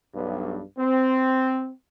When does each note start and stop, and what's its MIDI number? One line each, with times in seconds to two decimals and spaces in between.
0.15 0.62 35
0.15 0.62 43
0.79 1.71 60